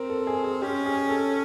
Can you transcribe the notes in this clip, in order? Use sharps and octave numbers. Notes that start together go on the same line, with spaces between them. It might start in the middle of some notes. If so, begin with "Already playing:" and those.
Already playing: C4 A#4
A4
G#4
G#4
C#4 G4
G#4
A4